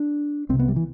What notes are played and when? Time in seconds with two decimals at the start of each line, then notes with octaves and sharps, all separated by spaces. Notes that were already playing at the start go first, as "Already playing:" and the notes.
Already playing: D4
0.49 C2 C4
0.54 C3
0.59 B3
0.68 G3
0.76 E3